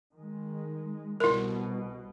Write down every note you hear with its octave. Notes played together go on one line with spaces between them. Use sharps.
D#3 G#3
C2 B2 E4 A#4